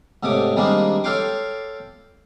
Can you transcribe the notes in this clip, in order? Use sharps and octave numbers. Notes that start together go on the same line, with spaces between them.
G#2 C3 A3 C#5 D6
D#3 G3 G#3 A#3 C4 D4
A4 C#5 F5 G5 C6 D6